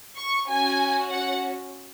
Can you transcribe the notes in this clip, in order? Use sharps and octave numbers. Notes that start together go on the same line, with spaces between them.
C#6
C#4 F#4 G#5
F#5